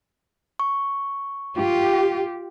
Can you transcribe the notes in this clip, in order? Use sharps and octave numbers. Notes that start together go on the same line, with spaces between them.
C#6
F4 G4